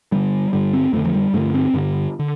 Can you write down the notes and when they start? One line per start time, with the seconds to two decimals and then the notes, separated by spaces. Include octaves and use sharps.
0.12 G2 D3 G3
0.53 G2 D3 G3
0.73 C4
0.93 F2 D3 A3
1.05 F3
1.14 G3
1.33 G2 D3 A3
1.54 C4
1.74 G2 D3
2.19 D3